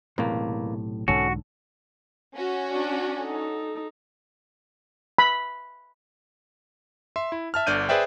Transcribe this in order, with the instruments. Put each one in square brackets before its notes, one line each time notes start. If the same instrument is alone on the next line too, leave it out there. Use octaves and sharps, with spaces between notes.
[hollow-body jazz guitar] B1 A2 C3 [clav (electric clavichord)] E2 A#3
[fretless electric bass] B1 G#2 D3 [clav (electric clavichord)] C#4 A4 [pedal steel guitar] F#4
[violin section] C#4 F#4
[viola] D4
D#4 A4
[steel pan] B5
[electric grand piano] E5 C6
E4
E5 A5 F6
G1 D3 D5 F6 G6 D#7
G#4 B4 C5 D5 E5 G5